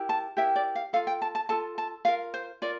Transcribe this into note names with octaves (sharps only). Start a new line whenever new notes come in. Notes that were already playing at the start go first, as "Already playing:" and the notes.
Already playing: E4 G4 A#4
A5
E4 G4 A#4 E5
D5
F5
F4 A4 F5
G5
A5
A5
F4 A4 A5
A5
F4 A#4 F5
C5
F4 A#4 D5